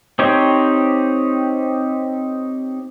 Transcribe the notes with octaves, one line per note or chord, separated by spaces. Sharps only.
C4 D#4 G4 C5 C#5